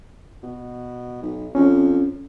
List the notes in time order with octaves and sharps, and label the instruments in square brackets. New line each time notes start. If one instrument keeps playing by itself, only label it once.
[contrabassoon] B2
B1
[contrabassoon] F2 [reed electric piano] C#4